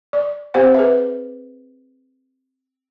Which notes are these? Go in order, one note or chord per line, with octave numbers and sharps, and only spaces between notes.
D5
C4 G4 C5 F#5
G#4 B4 E5